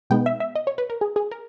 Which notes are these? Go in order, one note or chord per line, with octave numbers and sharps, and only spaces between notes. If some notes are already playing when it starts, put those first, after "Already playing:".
B2 G#3 B3 D#4 G5
E5
E5
D#5
C#5
B4
A#4
G#4
G#4
A#4